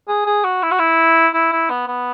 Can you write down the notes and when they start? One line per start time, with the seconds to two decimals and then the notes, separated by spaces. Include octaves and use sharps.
0.08 G#4
0.26 G#4
0.44 F#4
0.63 E4
0.71 F#4
0.79 E4
1.34 E4
1.52 E4
1.70 B3
1.88 B3